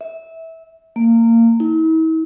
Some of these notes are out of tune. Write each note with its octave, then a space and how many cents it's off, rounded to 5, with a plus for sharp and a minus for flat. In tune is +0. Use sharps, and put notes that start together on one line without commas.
E5 -20
A#3 -25
E4 -45